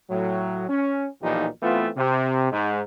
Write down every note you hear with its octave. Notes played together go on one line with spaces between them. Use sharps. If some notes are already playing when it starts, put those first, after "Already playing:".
A2 F#3
C#4
B1 A#2 E3 F3 D#4 G4
E3 A3 B3 C4 F4
C3
G#2